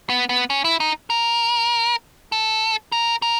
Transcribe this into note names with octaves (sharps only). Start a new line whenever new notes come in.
B3
B3
C#4
E4
D#4
A#4
A4
A#4
A#4